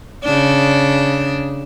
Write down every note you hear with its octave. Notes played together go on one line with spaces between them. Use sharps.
C#3 D4